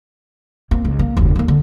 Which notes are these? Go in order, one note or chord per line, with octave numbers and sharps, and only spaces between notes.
A#3 C4
C#2
A#3
F1 D2
F#3 A#3
D3